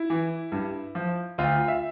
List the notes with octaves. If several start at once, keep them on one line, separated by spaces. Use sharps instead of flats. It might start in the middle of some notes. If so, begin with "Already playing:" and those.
Already playing: E4
E3
G2
F3
D2 F4
E5